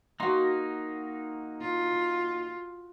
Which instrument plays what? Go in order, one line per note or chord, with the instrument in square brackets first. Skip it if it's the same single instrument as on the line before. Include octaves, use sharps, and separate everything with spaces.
[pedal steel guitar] A#3 D#4 [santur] F#4 C6
[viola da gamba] F4